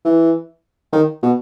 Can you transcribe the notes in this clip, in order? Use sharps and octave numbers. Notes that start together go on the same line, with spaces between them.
E3
D#3
B2